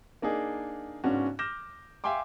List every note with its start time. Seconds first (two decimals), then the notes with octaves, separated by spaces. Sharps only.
0.22 A#3 D4 D#4 G#4
1.04 G#2 C#3 B3 C#4 D4 F#4
1.39 D6 F6 G6 A#6 E7
2.04 E5 F5 G5 G#5 C6 D6